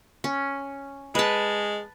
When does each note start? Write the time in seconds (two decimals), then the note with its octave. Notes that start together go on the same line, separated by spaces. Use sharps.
0.24 C#4
1.15 G#3 B4 A5